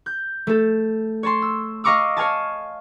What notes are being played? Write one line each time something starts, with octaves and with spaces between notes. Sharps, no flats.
G6
A3 A4
C#5 A5 C6
E6
D#5 F5 A#5 C#6 D6 E6
C#5 F5 G#5 A5